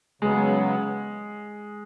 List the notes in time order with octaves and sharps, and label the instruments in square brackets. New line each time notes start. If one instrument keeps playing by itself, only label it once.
[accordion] C#3 F#3 B3 [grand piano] G#3